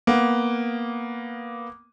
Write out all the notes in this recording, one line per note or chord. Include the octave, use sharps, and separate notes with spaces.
A#3 B3